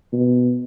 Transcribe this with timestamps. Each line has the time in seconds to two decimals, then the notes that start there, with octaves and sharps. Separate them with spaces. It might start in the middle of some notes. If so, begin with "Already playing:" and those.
0.13 B2